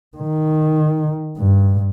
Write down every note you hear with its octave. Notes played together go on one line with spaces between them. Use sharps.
D#3
G2